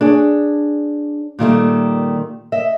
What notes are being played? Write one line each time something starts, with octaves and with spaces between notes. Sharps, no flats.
D4 G#4 C#5
A#2 D#3 G3 A3
D#5 E5